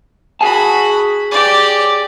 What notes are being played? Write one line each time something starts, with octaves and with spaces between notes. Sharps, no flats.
F#4 G#4 G#5 A5 B5
G4 D5